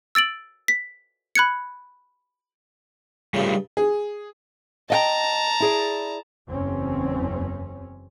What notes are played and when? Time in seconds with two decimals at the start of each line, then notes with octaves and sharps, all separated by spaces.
0.15 E6 A6 D7 F#7
0.68 B6
1.35 B5 F#6 G#6 C#7
3.34 G2 C#3 G3 A3 F4
3.77 G#4
4.90 D#5 F5 G5 A5 A#5
5.60 E4 G#4 D5
6.48 F#1 E2 C4 C#4